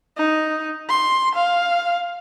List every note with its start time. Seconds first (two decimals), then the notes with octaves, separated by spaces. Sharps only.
0.17 D#4
0.89 C6
1.35 F5